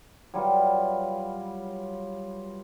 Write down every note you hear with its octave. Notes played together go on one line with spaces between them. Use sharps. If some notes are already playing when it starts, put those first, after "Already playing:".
F#3 G3 F4 B4